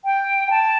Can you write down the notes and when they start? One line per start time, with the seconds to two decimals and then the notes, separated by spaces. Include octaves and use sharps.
0.05 G5
0.50 A5